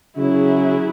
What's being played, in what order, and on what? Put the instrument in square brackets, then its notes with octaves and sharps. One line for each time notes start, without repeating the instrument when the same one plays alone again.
[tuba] C#3 [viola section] F#3 E4 G#4